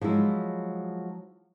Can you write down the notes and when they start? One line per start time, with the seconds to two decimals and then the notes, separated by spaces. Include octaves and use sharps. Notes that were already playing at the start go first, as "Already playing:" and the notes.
0.01 F3 F#3 G#3 E4